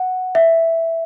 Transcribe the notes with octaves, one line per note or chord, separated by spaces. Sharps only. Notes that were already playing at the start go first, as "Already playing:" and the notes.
Already playing: F#5
E5